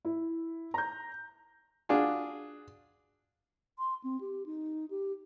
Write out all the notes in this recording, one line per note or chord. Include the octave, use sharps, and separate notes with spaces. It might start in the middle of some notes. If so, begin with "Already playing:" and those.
E4
A#5 G6
D4 F4 F#4 G#4
C6
C4
G4
D#4
G4